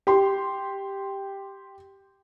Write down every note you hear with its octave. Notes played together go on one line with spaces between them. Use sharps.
G4 C6